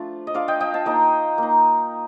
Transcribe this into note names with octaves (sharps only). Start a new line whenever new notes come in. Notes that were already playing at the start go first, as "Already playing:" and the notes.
Already playing: F3 A3 D4 F4
D#5
A3 D4 F4 D5 F5
D#5 G5
D#5 G5
F5 A5
A#3 D#4 D#5 G5
A#3 D#4